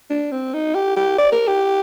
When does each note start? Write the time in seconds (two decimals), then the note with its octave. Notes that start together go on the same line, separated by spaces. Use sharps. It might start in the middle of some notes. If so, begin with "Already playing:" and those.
0.10 D4
0.32 C4
0.54 D#4
0.75 G4
0.96 G4
1.18 D5
1.32 A#4
1.48 G4